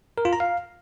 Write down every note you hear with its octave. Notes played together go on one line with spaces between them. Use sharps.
A#4
F4
A#5
F5